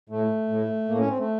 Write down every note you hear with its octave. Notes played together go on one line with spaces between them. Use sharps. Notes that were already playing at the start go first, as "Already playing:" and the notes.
A2 A3
A2
A2 A#3
C#4
C4
A3